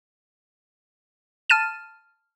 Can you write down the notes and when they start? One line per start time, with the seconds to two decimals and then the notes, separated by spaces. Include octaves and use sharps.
1.50 A5 F6 A6 D#7 E7